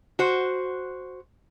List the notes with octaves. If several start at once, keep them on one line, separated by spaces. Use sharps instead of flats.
F#4 C5